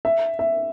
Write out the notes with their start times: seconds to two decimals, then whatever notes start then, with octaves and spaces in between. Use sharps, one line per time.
0.05 E5
0.39 E5